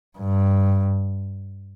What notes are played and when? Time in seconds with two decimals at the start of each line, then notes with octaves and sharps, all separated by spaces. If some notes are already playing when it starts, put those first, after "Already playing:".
0.18 G2